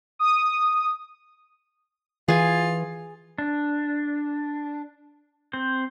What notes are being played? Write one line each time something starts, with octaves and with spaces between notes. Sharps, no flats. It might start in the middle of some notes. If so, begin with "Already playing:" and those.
D#6
E3 F4 G#4 G#5
D4
C4 C5